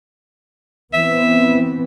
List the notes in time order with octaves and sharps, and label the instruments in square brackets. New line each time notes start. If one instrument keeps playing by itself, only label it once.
[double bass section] E3 B3 C4 [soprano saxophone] E5